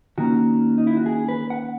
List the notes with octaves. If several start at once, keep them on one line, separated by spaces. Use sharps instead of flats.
D#3 A#3 C#4 F#4
D#4
E4
F#4
G#4
B4
F#5